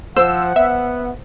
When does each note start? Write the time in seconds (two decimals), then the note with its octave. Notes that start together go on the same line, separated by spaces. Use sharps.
0.16 F3 C5 F#5 E6
0.56 B3 E5